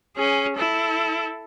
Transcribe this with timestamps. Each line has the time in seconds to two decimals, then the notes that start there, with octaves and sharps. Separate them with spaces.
0.16 C#4 G#4
0.56 E4 A4